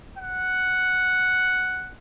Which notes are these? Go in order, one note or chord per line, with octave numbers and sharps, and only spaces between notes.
F#5